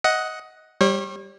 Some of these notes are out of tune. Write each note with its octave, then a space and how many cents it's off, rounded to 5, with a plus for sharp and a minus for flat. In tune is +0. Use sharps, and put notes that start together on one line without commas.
D#5 +15 F#5 +0
G3 +0 C#5 -40